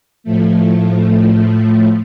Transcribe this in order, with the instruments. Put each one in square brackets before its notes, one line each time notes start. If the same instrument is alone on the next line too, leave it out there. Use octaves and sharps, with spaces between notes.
[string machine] A2 F3 A3